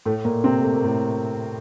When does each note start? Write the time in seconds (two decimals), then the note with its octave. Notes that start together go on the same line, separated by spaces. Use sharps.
0.06 A2 A3
0.25 A#2 A#3
0.44 C3 C4
0.62 A3
0.73 A#3
0.84 A2 A3